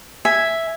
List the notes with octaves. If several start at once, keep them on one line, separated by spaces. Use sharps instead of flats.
E5 G#5